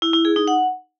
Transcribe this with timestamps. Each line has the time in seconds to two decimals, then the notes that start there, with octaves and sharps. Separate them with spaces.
0.02 E4
0.13 E4
0.25 G#4
0.36 D#4
0.47 F#5